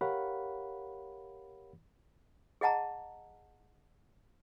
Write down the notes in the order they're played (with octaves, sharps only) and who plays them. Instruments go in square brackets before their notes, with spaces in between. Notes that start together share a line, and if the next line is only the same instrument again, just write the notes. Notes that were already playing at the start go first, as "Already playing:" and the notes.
[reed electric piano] G4 A#4 C#5 F5 F#5 B5
[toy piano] G#4 D#5 F#5 A5 A#5